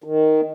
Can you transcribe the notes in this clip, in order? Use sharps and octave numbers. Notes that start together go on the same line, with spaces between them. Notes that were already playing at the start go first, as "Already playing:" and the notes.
D#3